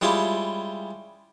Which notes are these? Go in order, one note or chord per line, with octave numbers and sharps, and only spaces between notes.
G3 G#3 C#4 E4 F4 G4